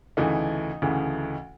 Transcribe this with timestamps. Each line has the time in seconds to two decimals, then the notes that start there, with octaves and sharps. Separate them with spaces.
0.17 D2 C#3 E3 A3 D#4
0.82 D2 C#3 E3 A3